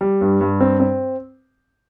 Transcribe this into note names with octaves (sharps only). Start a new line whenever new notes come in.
G3
G2
G2
C4
C4